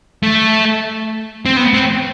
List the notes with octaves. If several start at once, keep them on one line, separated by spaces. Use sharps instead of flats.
A3
C4
B3
C4